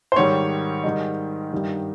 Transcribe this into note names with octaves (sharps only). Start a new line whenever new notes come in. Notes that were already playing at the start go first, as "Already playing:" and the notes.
C5
G#2 D#3 G3 C#5
G#2 D#3 G3 D#5
G2 D#3 G3